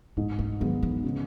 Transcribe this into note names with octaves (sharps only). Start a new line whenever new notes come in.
G#2 C#4
A3
D#3 F#3 G#3 B3
E3
C#3